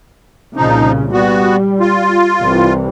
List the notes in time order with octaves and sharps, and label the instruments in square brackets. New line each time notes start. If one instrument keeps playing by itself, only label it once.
[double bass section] C2 A#2 C#3 [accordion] F3 D#4
[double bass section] G3 [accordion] B3 F#4
[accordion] F4
[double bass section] C2 C3 E3